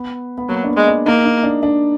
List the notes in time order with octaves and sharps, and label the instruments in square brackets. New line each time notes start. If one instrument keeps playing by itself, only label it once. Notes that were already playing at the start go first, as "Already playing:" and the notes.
Already playing: [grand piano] B3
B3
[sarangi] F#3 [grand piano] A#3
[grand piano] D4
B3
[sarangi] G#3
[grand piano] D4
[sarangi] A#3 [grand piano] D#4
[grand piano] D#4
D4
D4